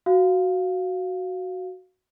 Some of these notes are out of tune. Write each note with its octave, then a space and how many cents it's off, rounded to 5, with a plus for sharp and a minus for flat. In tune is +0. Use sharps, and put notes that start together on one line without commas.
F#4 +0 F5 +0